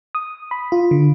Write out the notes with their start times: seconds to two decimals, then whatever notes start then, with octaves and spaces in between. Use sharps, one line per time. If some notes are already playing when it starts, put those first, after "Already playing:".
0.15 D#6
0.51 B5
0.72 F4
0.91 D3